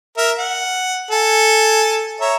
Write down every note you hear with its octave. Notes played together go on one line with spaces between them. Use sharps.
A#4 E5
F#5
A4 G#5
C#5 E5 A#5